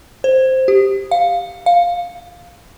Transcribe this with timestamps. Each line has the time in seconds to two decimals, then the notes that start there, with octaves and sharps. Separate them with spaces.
0.24 C5
0.68 G4
1.11 F5
1.66 F5